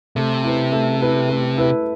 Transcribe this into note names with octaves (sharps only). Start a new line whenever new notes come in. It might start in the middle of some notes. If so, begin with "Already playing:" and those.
C3 A3
E4 B4
A3
E4 B4
A3
E4 B4